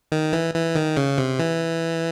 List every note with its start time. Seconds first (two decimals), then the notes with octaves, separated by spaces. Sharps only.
0.12 D#3
0.33 E3
0.54 E3
0.75 D#3
0.97 C#3
1.18 C3
1.39 E3